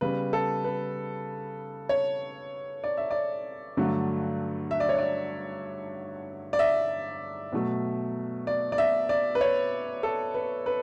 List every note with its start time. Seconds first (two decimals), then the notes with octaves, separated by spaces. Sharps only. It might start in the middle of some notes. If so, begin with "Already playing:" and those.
0.01 C#3 G3 B3 B4
0.33 A4
0.64 B4
1.89 C#5
2.84 D5
2.97 E5
3.11 D5
3.77 G2 D3 F#3 A3
4.71 E5
4.80 D5
4.89 C#5
4.98 D5
6.53 D5
6.59 E5
7.53 B2 F#3 A3
8.47 D5
8.72 D5
8.78 E5
9.09 D5
9.35 B4
9.41 C#5
10.03 A4
10.34 B4
10.66 B4